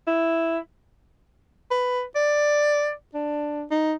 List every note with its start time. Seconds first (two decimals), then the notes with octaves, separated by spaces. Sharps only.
0.07 E4
1.71 B4
2.15 D5
3.14 D4
3.71 D#4